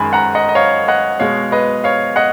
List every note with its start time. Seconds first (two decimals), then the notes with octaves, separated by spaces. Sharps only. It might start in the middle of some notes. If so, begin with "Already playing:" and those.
Already playing: F#2 D#3 G#3 G#5 B5
0.13 F#5 A#5
0.35 D#5 F#5
0.49 D#5
0.55 C#5 F5
0.88 D#5 F#5
1.19 B2 G#3 C#5 F5
1.52 B4 D#5
1.84 C#5 F5
2.16 D#5 F#5